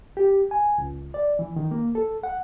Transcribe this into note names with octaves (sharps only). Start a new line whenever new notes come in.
G4
G#5
C#2
D5
E3
D#3
A#3
A4
F#5